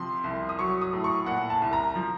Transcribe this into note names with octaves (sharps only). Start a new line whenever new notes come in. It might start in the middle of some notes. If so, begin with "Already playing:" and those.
Already playing: C3 F3 C6
C2
D#6
F#3 C#6
D#6
A2
C#6
A#2 F#5
A5
C2
A#5
F3